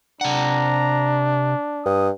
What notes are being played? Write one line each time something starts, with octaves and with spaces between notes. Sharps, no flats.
C3 D4 F#5 A#5
G2 D#6